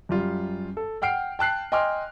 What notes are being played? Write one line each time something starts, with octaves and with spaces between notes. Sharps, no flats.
F#2 G3 F4
A4
F#5 G5 F6 C7 D7
G5 A5 F#6 C7
D#5 G5 G#5 C6 D6 F6